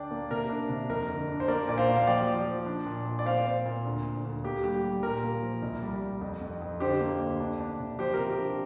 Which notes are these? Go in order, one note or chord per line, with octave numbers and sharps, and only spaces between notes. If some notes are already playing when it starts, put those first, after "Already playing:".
Already playing: D2 D4 D5 G5
A#3
C3 A#4
D4
C3
F2 A#4
D3
D4
C5
A#3 A#4 D5
A#2 D5
C5 F5
A#3
F5
F3 D5 G5
F3
F3
D4
A#2
A#2
D5
C4 C5 F5
C4
A#2
D2
D2
D2
A#3 G4
G3 G4
G3
A#2 A#4
A#3
F3
C2
G3
G3
F2
F2
F2
D3 G4 C5
A#3
D2
D4
D4
C3
F3 G4 C5
C3 A#4
G4
D4